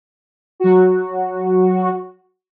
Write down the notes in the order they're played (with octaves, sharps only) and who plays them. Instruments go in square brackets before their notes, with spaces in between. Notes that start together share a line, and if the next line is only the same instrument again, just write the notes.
[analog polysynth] F#3 F#4